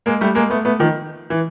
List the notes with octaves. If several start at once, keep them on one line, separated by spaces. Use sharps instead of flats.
G#3 A#3
G3 A3
G#3 A#3
A3 B3
A3 B3
D#3 F3
E3